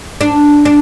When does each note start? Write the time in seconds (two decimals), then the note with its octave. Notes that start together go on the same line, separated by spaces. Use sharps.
0.21 D4
0.65 D4